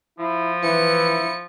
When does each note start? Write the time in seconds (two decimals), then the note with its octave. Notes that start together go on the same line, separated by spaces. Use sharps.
0.19 F3 E4
0.63 E3 E4 C#7